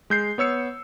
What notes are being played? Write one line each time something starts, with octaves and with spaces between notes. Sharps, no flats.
G#3 G6 C7
B3 C#5 E6 C#7